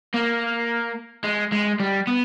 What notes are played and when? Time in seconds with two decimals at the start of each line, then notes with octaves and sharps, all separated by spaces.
0.14 A#3
1.24 G#3
1.52 G#3
1.80 G3
2.07 B3